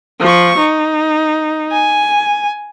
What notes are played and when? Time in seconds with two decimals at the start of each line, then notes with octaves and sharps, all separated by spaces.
0.20 F3 C#6
0.58 D#4
1.72 G#5